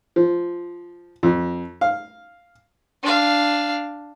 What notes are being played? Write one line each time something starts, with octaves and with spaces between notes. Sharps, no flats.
F3
F2
F5
D4 F5